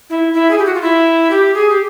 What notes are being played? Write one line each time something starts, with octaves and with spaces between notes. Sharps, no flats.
E4
E4
G#4
G4
F#4
F4
E4
G4
G#4
G4